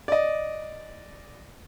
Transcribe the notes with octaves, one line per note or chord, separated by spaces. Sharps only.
D5 D#5